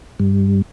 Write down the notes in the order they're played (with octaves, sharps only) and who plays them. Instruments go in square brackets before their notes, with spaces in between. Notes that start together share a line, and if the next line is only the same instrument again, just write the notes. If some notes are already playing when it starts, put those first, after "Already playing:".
[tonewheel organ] G2